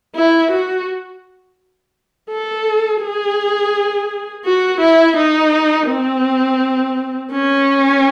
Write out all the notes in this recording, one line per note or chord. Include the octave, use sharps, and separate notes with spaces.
E4
F#4
A4
G#4
F#4
E4
D#4
C4
C#4